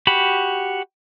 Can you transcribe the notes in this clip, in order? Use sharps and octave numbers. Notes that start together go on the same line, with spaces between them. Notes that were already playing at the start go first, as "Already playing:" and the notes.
F#4 G4 B5